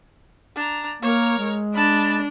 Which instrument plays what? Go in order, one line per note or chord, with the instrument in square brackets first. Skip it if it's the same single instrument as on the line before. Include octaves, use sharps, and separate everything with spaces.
[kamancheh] D4 A#5
[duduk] A#3 [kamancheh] A#4 C#5
[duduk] G#3
[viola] D4 [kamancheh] A5 B5